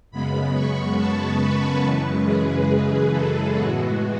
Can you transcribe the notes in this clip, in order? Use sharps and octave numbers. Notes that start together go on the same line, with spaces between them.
F#2 C#3 G#3 B3 B5
C#6
A5
B4
F#2 C#3 E3 G#3
G#4
A4
A2 E3 G#3 B3 F#4